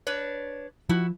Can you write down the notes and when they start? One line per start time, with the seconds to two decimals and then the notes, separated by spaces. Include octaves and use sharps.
0.07 D4 B4 C#5
0.89 F3 E4 F#4